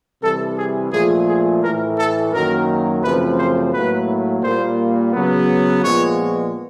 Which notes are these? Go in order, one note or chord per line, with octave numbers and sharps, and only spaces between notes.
C3 E3 G3 A4
G#4
A#2 F3 A3 G#4
G#4
A2 E3 A3 A#4
A4
F#2 D#3 F#3 A#3 A#4
F#2 C#3 F3 A3 C4 B4
C5
A2 F#3 A#3 B4
A#2 G3 A#3 C5
C#3 F#3 B3
A#2 F3 G#3 B3 C#5